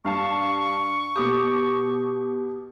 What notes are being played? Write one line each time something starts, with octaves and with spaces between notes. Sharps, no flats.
G2 F5 A5 C#6
B2 G4 D6 D#6